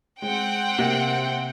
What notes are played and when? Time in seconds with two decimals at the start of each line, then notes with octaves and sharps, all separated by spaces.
0.22 G#3 C4 F#5 G5
0.78 C3 A#3